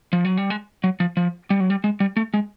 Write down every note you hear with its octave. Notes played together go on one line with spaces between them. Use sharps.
F3
F#3
G3
G#3
F#3
F3
F3
G3
F#3
G3
G#3
G3
A3
G#3